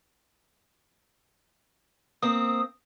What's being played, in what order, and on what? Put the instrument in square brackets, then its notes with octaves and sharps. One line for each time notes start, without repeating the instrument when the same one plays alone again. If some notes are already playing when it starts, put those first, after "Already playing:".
[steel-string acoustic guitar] A#3 C4 [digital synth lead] D#6